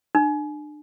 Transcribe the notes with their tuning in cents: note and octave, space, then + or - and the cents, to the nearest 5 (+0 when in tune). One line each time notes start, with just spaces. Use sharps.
D4 +35